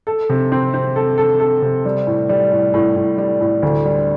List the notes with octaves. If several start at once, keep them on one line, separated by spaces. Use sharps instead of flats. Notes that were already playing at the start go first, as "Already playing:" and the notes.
A4
C3
C4
C4
A4
A4
A4
C3
G3
A2
G3
A2
A2
A2
G3
A2
D2
G3